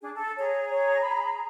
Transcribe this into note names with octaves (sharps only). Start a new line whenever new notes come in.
D4 G#4
A4
G#4 C#5 A#5
C#5
B5